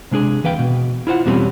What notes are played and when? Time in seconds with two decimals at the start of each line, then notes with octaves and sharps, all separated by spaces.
0.11 C3 G#3 D4 G#4
0.43 D#2 E3 B4 F5 G5
0.59 B2
1.07 E4 F4 C5 F#5
1.26 E2 B2 G3 G#3 C4 C#4